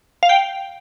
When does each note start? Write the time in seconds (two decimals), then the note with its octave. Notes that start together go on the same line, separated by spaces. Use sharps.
0.23 F5
0.29 G5